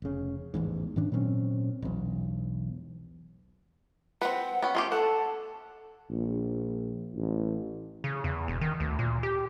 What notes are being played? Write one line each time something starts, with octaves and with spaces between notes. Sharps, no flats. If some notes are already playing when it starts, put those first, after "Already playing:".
F1 C#3
A1 E2 G#2
G#2 D#3 C#4 D4
A#2 F#3 C4 C#4
E1 B1
C4 B4 F#5
B3 C#4
A3 C#4 G4 C6
A4 F#5 A5
A#1
A1
C#3
E2
E1
D#3
D2
A#2
G4